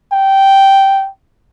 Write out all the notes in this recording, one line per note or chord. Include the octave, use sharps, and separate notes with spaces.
G5